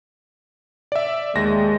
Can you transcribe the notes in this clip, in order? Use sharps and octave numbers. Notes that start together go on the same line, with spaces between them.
D5 E5
D#2 G#3 A#6